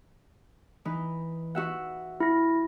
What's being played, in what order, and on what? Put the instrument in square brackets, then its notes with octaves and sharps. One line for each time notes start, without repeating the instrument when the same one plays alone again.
[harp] E3 D#4 B4
F#4 E5 F#5
[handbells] E4 A#6